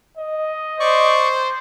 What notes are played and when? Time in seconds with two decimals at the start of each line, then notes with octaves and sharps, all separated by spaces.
0.17 D#5
0.80 C5 D5 C#6